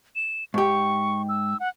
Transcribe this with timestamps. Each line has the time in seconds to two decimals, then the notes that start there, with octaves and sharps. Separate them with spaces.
0.16 E7
0.54 G#2 G4 C#6
1.29 E6
1.60 F#5